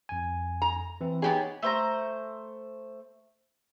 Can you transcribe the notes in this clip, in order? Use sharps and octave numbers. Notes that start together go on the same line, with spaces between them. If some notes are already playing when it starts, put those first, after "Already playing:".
F2 G#5
A#5
E3 C4 E4
B3 D#4 G4 G#4 C#5
A3 C5 A#5